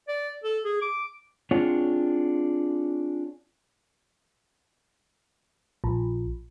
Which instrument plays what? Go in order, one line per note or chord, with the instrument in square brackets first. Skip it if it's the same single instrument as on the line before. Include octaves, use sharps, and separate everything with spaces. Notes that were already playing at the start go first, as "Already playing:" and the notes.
[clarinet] D5
A4
G#4
D6
[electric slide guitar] C4 D4 F4 G#4 C#5 F#5
[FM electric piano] A#1